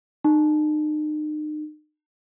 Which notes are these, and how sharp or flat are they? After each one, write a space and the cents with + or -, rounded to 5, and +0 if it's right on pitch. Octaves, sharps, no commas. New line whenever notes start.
D#4 -40